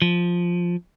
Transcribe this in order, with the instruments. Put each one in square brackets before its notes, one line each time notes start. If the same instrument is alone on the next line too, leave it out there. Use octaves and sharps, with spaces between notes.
[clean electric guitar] F3